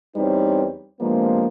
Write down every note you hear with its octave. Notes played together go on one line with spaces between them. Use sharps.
E2 G3 C4 D#4 B4 C#5
C3 F3 G#3 A#3 B3 D4